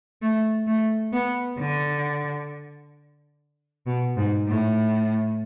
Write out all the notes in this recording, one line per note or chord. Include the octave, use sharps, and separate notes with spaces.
A3
A3
B3
D3
B2
G#2
A2